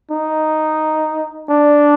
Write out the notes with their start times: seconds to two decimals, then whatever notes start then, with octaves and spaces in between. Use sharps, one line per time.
0.11 D#4
1.49 D4